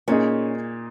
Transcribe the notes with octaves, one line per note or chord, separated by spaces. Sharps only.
A#2 A#3 C#4 D#4 G#4